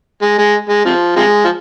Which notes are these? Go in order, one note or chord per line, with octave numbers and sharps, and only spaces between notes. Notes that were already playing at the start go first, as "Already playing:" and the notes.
G#3
G#3
G#3
C3 F3
C3 F3 G#3
F3